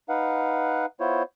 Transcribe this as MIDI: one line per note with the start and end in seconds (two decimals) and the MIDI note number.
0.09 0.86 63
0.09 0.86 71
0.09 0.86 77
0.09 0.86 78
1.00 1.23 59
1.00 1.23 64
1.00 1.23 65
1.00 1.23 72
1.00 1.23 73